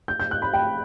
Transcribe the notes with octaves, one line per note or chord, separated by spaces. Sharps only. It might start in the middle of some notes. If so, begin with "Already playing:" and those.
G6
G6
F#6
B5
G5